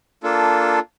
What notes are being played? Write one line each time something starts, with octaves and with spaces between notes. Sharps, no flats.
A#3 D4 F4 A4